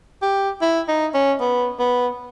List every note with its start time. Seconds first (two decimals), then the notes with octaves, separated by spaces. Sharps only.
0.22 G4
0.62 E4
0.88 D#4
1.14 C#4
1.40 B3
1.79 B3